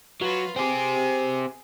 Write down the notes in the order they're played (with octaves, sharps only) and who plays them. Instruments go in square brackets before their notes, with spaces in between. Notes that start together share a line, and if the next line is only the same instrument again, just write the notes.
[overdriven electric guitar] F#3 [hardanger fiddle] F4 B4
[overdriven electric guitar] C4 G4 [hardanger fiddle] G#4